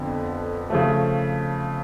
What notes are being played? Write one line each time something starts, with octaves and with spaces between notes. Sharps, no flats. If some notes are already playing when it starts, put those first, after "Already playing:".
Already playing: F2 D3 F3 B3
C#3 F3 A3